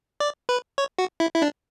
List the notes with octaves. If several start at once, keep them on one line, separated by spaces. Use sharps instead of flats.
D5
B4
C#5
F#4
E4
E4
D4